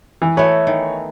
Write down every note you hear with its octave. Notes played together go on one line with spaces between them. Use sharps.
E3
A3 B3 B4 C#5
D#3